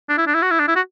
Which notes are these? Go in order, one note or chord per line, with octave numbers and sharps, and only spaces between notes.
D4
E4
D4
E4
F#4
E4
D4
E4
F#4